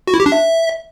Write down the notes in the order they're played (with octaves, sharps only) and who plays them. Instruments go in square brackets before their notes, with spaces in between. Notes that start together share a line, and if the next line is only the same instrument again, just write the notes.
[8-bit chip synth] F#4
E4
G4
D4
E5